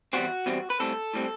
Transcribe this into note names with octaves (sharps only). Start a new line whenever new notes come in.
E2 B2 G3 C4 F#4
E2 B2 G3 C4
B4
B1 A2 G3 C4 A4
A2 G3 C4